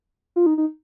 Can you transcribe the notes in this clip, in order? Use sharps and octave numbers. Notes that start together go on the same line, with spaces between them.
F4
D#4
D#4